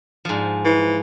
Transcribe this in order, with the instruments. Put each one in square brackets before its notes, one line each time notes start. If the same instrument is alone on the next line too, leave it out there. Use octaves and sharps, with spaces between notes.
[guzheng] G#2 F3
[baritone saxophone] E3